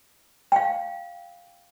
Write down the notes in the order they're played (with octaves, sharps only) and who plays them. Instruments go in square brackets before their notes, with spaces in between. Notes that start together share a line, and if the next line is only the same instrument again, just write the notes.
[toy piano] F5 G5